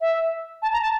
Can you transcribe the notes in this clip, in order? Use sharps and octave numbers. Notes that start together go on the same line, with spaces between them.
E5
A5
A#5
A5